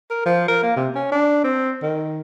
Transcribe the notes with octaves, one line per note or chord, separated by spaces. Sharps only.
A#4
F3
A#4
A#3
C3
C#4
D4
C4
D#3